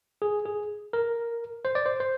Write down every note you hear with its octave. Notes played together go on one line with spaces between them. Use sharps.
G#4
G#4
A#4
C5
D5
C5
C5